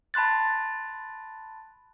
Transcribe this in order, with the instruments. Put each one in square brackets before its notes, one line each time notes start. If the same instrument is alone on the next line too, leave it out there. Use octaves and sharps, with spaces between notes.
[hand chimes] A5 B5 C6 F#6 A6